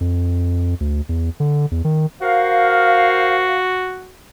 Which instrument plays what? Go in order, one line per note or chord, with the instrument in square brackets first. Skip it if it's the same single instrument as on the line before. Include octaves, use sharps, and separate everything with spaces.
[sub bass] F2
D2
E2
D3
E2
D#3
[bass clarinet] F#4 [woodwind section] A#4 C5 F5